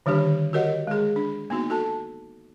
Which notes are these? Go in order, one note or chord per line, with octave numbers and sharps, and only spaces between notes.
D3 D#3 G3 D4 G4
F#4 G4 A#4 C#5 D#5 F#5
G#3 G#4
D4
A#3 B3 D#4 F#4
F#4 A4 A5